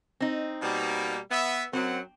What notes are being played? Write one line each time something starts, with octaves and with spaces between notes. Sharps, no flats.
C4 D#4
B2 G3 A#3
B3 E5
F#2 F#3 C4 F#5